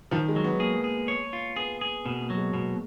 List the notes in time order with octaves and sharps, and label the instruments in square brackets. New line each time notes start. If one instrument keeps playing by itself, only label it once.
[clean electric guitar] D#3 [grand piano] F3
[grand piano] G#3
[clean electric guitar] F#3
[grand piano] B3
[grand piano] A#3 [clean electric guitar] G#4
[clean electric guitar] G#4
C#5
F4
[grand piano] B3 [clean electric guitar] G#4
[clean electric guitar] G#4
[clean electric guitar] B2 [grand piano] A#3
[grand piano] A#3
[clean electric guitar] F#3
[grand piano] G#3
[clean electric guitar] B2